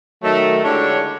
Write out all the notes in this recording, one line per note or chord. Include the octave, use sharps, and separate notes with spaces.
D#3 F#3 A3
D3 G#3 D4 E4 G4 C#5